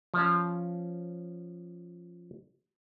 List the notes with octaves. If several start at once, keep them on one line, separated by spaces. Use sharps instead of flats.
F3 C#4